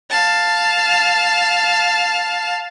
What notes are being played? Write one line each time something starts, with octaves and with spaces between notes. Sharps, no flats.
F5 A5